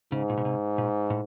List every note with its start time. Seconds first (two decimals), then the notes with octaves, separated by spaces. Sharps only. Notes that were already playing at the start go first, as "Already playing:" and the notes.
0.12 G#2 C#3
0.29 A#2
0.37 B2
0.45 C3
0.78 A#2
1.10 A2